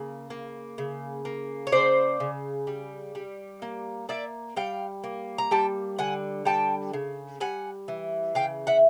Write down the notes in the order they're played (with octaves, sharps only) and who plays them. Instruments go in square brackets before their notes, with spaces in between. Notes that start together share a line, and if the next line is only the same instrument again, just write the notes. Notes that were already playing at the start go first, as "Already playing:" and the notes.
Already playing: [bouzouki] C#3 A#3
A#3
C#3
A#3
C#5
C#3 C5 D5
C#3
G3
G3
A#3
A#3 D5 E5
G3 F5 G5
A#3
A#5
G3 G5 A5
D3 F#5 G#5
G3 G5 A5
C#3
G3 F#5 G#5
E3
C#3 F5 G5
E5 F#5